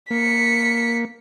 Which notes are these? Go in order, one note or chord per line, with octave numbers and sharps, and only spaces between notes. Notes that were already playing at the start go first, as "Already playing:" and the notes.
A#3 B6 C#7